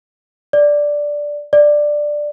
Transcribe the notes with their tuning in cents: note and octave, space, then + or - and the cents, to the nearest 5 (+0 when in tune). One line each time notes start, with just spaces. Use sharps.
D5 +0
D5 +10